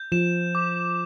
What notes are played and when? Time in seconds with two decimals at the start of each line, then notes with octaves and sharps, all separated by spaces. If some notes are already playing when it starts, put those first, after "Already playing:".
Already playing: G6
0.12 F3 E7
0.55 D6